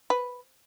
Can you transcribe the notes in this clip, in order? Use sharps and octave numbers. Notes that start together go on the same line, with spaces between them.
B4